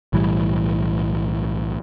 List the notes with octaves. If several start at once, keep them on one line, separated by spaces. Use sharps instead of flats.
B1 A2 E3 G3